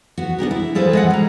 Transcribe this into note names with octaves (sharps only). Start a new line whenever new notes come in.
B3 F#4
B3 D4 G4 A#4
E4
F4 G#4 A4 B4 C5
G#3 D#5 F#5
G3 A#5